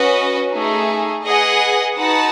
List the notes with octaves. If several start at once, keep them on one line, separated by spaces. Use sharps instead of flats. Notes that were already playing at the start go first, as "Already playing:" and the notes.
Already playing: C#4 F#4 B4 D#5
A3 D#4 G#4
G#4 B4 D#5 F#5
D#4 F#4 B4 F#5 A5